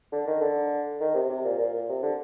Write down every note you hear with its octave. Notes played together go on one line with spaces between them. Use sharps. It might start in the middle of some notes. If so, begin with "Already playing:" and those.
D3
D#3
D3
D#3
C3
C3
A#2
A#2
A#2
C3
D3